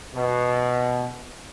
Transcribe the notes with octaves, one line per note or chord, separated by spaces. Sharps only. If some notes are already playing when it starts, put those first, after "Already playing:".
B2